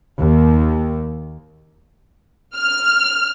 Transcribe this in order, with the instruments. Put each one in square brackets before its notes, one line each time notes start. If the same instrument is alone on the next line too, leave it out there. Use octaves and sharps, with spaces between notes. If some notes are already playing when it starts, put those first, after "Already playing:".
[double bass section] D#2
[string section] F6